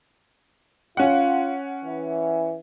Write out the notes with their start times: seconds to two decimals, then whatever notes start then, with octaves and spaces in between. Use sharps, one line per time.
0.97 C#4 F4 F#5
1.84 E3